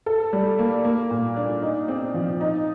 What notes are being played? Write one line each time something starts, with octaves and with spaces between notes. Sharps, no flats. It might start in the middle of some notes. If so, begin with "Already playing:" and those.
A4
G3
A#3
A#3
A#2
D4
D#4
C4
F3
D#4